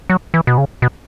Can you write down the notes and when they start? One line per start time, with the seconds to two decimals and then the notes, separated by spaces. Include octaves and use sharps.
0.10 F#3
0.34 E3
0.47 B2
0.58 C#3
0.82 B2